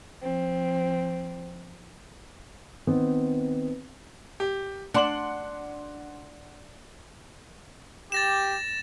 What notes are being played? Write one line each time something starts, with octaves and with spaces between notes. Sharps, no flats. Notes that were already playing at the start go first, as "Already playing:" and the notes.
F3 C4
D#3 B3 C4
G4
D4 F#5 C6 F#7
G4 A6 A#6 E7